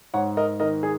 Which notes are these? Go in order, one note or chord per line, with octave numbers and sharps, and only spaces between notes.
G#2 C#5 F#5
A#4 D#5
D#3 A#4 D#5
G#4